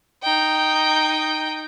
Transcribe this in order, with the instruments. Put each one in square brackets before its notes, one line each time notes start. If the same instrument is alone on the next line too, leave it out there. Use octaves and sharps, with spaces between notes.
[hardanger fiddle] D#4 G5